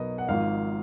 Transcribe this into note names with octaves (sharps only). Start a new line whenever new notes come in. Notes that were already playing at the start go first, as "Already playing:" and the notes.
Already playing: B1 B2 F#3 A#4 B4 D#5
F#5
G#1 G#2 F3 F5